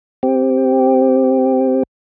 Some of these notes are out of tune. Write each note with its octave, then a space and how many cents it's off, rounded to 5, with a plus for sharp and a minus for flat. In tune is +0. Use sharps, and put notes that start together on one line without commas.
C4 +0 G4 +0